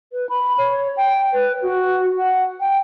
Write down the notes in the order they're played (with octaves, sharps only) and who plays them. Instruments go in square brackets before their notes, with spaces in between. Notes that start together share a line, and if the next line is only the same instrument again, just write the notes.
[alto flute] B4
B5
C#5
G5
B4
F#4
F#5
G5